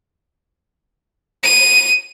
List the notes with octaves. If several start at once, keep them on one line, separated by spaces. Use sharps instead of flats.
D#7